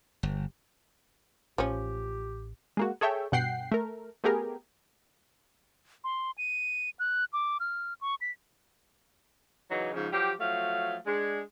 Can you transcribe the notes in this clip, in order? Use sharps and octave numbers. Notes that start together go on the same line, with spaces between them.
G1
A1 F3 C#4 G4
G#3 A#3 F#4
G#4 A4 C#5 E5 G5
G2 B2 F#5 G5 C7
A3 A#4
A3 B3 G4 G#4 A#4
C6
D#7
F#6
D6
F6
C#6
B6
C#3 E3 F#3 D#4
G#2 C#3 F3
F3 F#3 G4
F3 F#3 A3 F5
G#3 D4